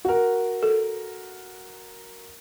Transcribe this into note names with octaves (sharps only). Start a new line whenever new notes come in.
F#4 A#4
A4